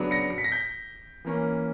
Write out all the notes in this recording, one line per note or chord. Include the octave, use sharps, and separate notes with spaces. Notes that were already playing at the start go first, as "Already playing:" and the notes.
Already playing: C#3 F#3 B3 D4
A#6 C#7
C#7
B6
A#6
G6 B6
E3 A#3 C#4